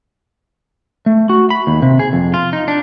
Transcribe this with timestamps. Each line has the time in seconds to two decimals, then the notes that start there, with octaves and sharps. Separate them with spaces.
1.06 A3
1.29 F#4
1.50 B5
1.67 D#2
1.82 C3
1.99 G#4
2.13 F2
2.34 F4
2.53 D#4
2.68 D4